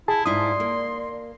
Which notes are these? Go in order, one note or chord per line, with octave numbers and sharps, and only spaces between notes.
E4 G#4 A5
G#2 E4 F4 D5 C6 D#6
A#3